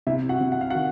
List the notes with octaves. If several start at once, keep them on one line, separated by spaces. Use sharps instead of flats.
C3 E4 E5
F#4 F#5
C3
F#5
F5
D#3 F#4 F#5